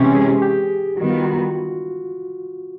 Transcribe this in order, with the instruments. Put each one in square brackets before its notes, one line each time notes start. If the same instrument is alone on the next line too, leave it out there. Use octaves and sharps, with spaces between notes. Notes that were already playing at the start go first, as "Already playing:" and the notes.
Already playing: [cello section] C3 E3 G#3 C#4 [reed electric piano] G4
[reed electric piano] G#4
G4
[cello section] D#3 G3 B3 [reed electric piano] F#4
[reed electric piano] F4
F#4